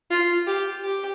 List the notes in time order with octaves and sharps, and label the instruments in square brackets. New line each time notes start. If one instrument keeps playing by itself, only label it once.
[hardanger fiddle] F4
G4
G4